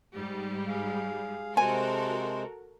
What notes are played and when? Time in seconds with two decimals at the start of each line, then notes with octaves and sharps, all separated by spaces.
0.15 G#2 G3
0.67 G#4 F5
1.57 C3 G#3 F#4 A4 A#4 C5 G#5